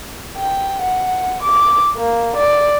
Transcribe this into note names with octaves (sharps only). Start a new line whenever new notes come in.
G5
F#5
D6
A#3
D5